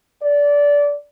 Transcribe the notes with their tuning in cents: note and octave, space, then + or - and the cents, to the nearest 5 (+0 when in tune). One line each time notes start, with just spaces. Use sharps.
D5 -20